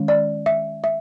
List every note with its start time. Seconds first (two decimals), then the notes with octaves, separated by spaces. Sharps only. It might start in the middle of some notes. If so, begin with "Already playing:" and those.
Already playing: D#3 G#3 C#4
0.08 D5
0.46 E5
0.84 E5